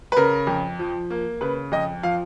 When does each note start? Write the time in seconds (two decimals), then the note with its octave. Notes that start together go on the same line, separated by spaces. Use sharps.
0.12 B4
0.16 C#3 A#4
0.47 F2
0.79 F3
1.10 A#3
1.41 C#3 B4
1.72 F2 D#5
2.03 F3 F5